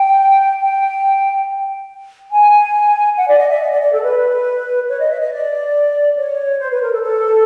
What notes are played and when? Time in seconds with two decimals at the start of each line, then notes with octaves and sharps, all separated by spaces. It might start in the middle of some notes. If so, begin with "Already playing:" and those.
Already playing: G5
0.60 G5
2.32 G#5
3.17 F#5
3.28 D5
3.38 D#5
3.49 E5
3.60 D#5
3.71 D5
3.81 D5
3.92 A4
4.02 B4
4.89 C#5
5.00 D#5
5.10 E5
5.20 D#5
5.31 D5
6.17 C#5
6.60 C5
6.71 B4
6.81 A#4
6.91 A4
7.02 A4